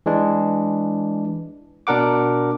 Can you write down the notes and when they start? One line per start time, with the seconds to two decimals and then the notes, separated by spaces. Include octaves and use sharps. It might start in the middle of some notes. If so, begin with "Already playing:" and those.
0.06 E3 G#3 D4
1.87 B2 D4 A#4 F#5 D6